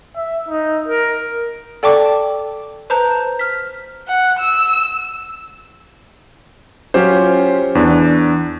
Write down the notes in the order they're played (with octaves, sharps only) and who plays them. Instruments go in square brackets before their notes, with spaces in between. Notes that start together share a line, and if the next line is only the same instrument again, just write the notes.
[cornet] E5
D#4
A#4
[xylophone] A4 D5 G5 A5 C#6 D6
B4 C5 A5 A#5 G6
F6 B6
[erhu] F#5
E6
[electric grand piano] F#3 C#4 F4 G4 C5
E2 D4